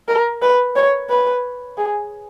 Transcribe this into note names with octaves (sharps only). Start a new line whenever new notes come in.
A#4
B4
C#5
B4
G#4